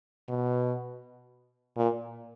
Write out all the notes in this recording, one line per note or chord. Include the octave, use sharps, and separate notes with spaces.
B2
A#2